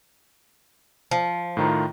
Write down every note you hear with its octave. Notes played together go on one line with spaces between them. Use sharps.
F3
A2 D#3 F4 A#5